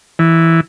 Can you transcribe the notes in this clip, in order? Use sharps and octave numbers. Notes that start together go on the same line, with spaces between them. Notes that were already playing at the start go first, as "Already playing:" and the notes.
E3